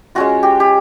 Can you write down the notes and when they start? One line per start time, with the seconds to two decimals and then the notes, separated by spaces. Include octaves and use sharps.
0.15 G#3 C#4 F4 F#4
0.43 G4
0.60 G4